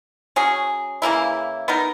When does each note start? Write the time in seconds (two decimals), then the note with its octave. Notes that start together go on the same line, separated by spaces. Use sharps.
0.36 F#3 C#4 G#4
1.02 C#3 E3 A#3 E4
1.68 B3 D#4 A#4